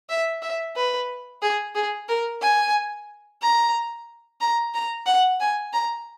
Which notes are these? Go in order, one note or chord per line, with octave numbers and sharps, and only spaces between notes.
E5
E5
B4
G#4
G#4
A#4
G#5
A#5
A#5
A#5
F#5
G#5
A#5